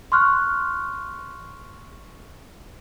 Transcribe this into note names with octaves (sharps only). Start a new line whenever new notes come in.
C6 C#6 F6 F#6